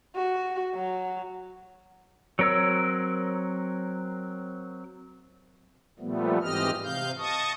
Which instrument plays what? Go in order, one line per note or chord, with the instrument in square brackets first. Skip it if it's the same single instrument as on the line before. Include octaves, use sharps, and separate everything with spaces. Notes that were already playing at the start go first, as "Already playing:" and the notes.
[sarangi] F#4
F#3
[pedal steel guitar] F#3 C4 A#4 C#5 E6
[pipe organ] A#2 F3 G3 A3 B3
G#2 E3 C4 G4 D#5 F6
C3 F5 G6
D#5 A5 C#6 D#6